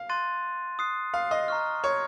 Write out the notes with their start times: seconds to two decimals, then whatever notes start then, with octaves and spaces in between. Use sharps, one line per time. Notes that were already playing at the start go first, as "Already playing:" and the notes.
Already playing: F5
0.09 C6 F#6 A6 D#7
0.79 D#6 F#6 C7
1.14 F5
1.31 D#5
1.48 A#5 C#6 F6
1.84 C#5